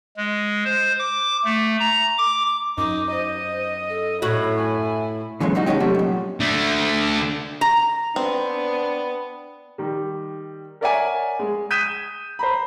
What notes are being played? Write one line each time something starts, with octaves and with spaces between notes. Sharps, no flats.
G#3
C5
D6
A3
A#5
D6
F#2 D#4 D6
C5 D#5
A4
A2 E4 F#4 C#5
G#5
A#2 C#3 E3 F#3 G#3
F#2 G3 D#4 F#4
B2 D#3 G#3 C#4 D#4 G4
C3 F#3 G3 A3 F#4
F#2 A#2
D3 A3
A#5
B3 C4 D4
D#3 G3
A#4 C#5 D5 E5 F#5 G#5
G#3
D#6 G6 G#6 B6 D#7 E7
C5 A#5 B5